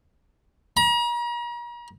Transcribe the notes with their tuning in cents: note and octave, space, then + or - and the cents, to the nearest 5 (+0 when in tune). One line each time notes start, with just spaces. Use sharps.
A#5 +40